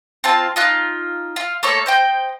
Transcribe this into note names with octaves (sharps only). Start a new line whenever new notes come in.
C4 F4 A5
D#4 F4 F#6
F4
A3 A#3 A4 C#5
C5 D#5 G5